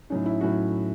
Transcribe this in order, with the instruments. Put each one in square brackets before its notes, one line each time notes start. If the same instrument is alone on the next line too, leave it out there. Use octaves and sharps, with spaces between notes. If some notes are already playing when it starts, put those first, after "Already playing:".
[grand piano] A2 F#3 C#4 D#4
E4
A2 F#3 C#4 F#4